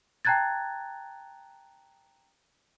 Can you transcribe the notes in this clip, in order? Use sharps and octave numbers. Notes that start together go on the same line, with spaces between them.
G5 A5 A#5 F#6 G#6 A6